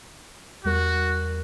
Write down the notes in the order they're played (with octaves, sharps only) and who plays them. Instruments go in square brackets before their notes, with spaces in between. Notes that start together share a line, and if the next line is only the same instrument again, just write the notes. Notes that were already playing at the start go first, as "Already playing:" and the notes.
[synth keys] E2 G3 A#4 [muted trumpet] F#4